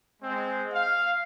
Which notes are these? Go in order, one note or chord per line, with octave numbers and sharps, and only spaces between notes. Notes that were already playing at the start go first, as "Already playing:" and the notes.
G#3 C4
F5